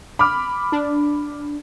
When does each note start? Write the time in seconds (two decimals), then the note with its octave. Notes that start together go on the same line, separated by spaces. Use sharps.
0.19 B5 D6 F6
0.72 D4